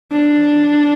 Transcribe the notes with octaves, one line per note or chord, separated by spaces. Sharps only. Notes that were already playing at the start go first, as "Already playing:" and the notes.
D4